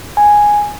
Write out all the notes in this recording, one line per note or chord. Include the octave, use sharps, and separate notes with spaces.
G#5